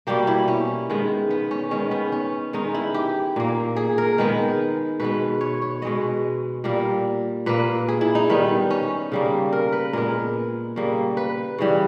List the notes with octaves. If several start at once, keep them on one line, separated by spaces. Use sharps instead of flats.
B2 G3 A#3 G4
E4
C#4
D#3 G#3 B3
B3
C#4
D#3 G#3 B3 C#4
B3
C#4
D#3 G#3 B3 D#4
E4
G4
A#2 A#3
G#4
A#4
D#3 G#3 B3
B2 G#3 B3 B4
C#5
C#5
B2 G#3 B3 D#5
A#2 G3 A#3 A#4
A#2 A#3 B4
G#4
E4
D#4
D#3 G3 B3
C#4
C#3 G3 A#3
A#4
B4
A#2 G#3 B3 A#4
C#3 G3 A#3
B4
C#3 E3 G3